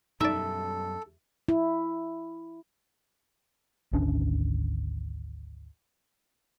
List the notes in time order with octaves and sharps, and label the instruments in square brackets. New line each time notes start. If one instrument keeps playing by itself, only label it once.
[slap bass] F#2 B2 G3 [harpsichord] D#4 D5 [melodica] A4 [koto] E5
[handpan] E4
[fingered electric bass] G#1 D2 C#4 D4